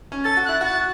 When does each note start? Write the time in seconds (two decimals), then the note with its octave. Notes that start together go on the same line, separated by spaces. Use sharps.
0.12 C#4
0.24 A4 A6
0.37 F#4
0.45 E4 F#6
0.61 F#4 A6